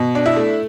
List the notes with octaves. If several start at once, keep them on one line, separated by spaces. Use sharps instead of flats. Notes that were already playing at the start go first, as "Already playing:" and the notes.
Already playing: B2
D4
E4 E5
A3